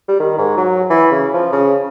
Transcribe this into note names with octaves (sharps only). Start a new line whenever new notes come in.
G3
D#3
G#2
F#3
E3
C#3
F3
C#3